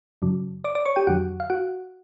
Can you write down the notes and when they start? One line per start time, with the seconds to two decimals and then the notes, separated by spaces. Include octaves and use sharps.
0.22 F#2 C#3 F#3
0.64 D5 D6
0.75 D5 D6
0.85 C#5 C#6
0.96 G4 G5
1.07 F2 D3 F#3 F#4 F#5
1.40 F5
1.50 F#4 F#5